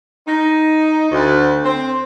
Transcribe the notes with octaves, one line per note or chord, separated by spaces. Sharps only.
D#4
D2
C4